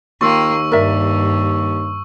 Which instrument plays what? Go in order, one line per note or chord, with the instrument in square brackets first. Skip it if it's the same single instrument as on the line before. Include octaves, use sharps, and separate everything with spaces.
[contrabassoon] D#2 [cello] A#3 [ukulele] F4 G5 [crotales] C#6 E6
[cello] G2 [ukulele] A#4 D5 E5